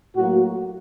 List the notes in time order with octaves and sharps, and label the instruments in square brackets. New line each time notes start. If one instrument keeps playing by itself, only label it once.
[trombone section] A2 F#3 A#3 F#4